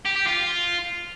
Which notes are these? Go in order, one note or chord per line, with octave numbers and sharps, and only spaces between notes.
G4
G4
F4